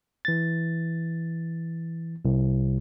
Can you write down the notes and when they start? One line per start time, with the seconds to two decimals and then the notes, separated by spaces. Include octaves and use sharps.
0.25 E3 A6
2.25 C2